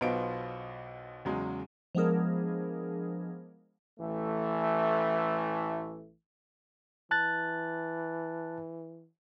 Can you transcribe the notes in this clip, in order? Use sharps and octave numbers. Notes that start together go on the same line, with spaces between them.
B1 B2 B3 F4 C5 D7
E2 C#3 F#3 G#3
F3 G#3 B3 D4 G#4 A#4
A1 E3 A3
E3 A5 F#6 A6